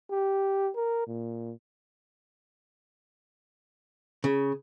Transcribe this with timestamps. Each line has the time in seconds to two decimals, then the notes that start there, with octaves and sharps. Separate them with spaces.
0.11 G4
0.76 A#4
1.07 A#2
4.24 C#3